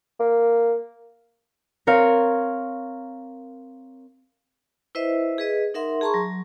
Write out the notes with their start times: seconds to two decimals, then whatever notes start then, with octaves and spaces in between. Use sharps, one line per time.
0.20 A#3
1.87 C4 A#4 C#5 F5
4.95 E4 B4 C5 D#5 E5
5.38 G#4 B4 D#5
5.74 D#4 A#4 E5 F#5 C6
6.01 G#4 A5 A#5 C6 C#6
6.14 F#3